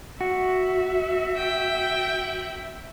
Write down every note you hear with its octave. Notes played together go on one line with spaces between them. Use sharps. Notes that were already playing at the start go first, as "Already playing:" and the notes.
F#4 E5
G5